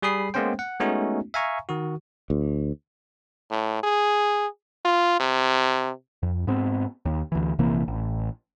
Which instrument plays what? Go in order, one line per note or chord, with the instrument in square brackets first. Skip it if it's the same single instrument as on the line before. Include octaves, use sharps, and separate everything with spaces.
[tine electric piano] G3 G#4 B5 D#6 C7
G#3 A#3 B3 C#4 C5 G5
F#5
G#3 A3 B3 C#4 D#4 F#4
E5 F5 G#5 A#5 C#6
D#3 F#4
[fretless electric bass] D2
[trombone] A2
G#4
F4
C3
[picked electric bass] F2
G#2 B3 C4
D#2
D2 E3
A#1 C3 E3 A#3
A1